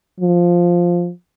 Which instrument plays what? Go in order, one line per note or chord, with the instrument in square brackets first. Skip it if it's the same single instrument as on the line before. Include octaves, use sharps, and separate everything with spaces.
[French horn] F3